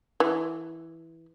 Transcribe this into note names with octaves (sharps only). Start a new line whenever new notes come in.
E3